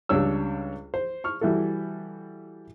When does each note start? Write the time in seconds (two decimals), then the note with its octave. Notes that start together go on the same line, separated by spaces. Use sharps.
0.09 C#2 G3 D4 C#5 E6
0.94 C5
1.24 C#6 F6
1.41 E3 G3 E4 F#4 A4